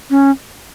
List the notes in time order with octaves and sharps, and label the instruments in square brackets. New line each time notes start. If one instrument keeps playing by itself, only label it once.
[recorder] C#4